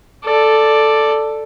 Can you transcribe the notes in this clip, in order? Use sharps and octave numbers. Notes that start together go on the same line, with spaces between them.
A4 D5